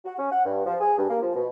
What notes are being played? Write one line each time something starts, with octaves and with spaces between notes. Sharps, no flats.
F#4
C#4
F#5
G2
F3
G#4
G2
A#3
F3
B2